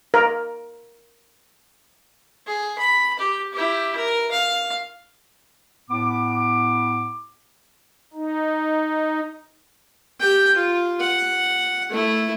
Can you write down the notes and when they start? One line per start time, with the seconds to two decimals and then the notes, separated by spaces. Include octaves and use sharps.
0.14 A#4
2.47 G#4
2.78 B5
3.19 G4
3.53 E4 G4
3.97 A#4
4.31 F5
5.90 A2 B3 D6
8.14 D#4
10.20 G4 G5
10.55 F4
11.00 F#5
11.90 A3 E4